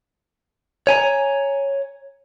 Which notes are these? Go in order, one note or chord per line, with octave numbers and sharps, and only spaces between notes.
C#5 G#5 A#5